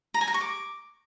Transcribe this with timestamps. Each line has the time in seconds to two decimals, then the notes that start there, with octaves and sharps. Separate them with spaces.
0.14 A#5
0.21 G#5
0.28 A#5
0.34 C#6
0.41 D6